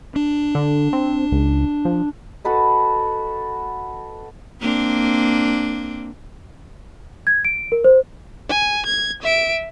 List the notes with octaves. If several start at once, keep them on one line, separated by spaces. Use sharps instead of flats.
D4
D3
C4
C#2
F3
F#4 A4 B4 D#5
A#3 C4 D4
G#6
D7
A#4
C5
G#5
G#6
E5 D7